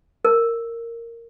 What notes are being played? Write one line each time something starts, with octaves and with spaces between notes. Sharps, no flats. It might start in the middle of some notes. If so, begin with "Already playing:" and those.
A#4